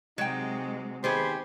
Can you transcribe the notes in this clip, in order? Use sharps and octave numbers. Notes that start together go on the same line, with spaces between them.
C3 F#3 G#3 D#4 G5
D#3 B3 G4 G#4 C5